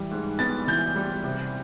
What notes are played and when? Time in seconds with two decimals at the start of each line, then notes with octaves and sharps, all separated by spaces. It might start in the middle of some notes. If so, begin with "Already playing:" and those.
Already playing: E3 G3
0.11 G#2
0.39 B3 A6
0.67 E3 G6
0.96 G3
1.24 C3